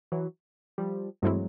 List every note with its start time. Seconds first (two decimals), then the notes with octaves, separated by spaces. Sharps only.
0.12 E3 F#3
0.78 F3 G3
1.22 G2 E3 F#3 G#3 A3 C4 E4